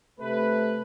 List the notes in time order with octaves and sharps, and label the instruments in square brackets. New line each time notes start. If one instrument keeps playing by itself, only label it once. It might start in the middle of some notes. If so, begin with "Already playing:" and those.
[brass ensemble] C3 A3 B4